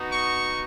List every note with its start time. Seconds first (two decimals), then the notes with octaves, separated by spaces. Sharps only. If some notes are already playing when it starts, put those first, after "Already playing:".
Already playing: B3 D#4 F#4
0.13 C#6